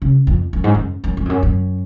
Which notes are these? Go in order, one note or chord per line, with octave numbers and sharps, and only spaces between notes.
C#3
F2
F#2
G#2
F#2
F#2
F#2
F2
F#2
F#2